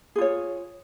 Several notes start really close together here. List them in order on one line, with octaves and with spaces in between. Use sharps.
G#4 F4 C#5